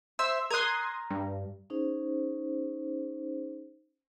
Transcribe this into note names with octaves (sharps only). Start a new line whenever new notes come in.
C5 E5 E6
A#4 C6 D#6 F#6 G#6
G2
C#4 D#4 G#4 C5